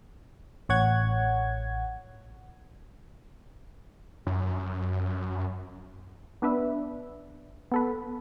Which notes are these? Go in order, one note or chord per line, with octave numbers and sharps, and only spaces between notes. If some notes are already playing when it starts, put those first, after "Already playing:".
A1 C#5 F#5 G#6
F#2
B3 D4 B4 E5
B3 A4 B4